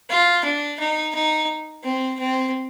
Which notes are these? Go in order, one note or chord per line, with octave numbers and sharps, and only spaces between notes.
F4
D4
D#4
D#4
C4
C4